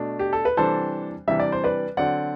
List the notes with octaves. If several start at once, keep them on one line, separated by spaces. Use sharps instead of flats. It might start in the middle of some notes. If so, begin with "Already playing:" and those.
Already playing: B2 A3 D4
G4
A4
B4
C3 E3 G3 D4 A4 C5
C3 E3 G3 D4 E5
D5
C5
B4 D5
D3 F#3 C4 D5 F#5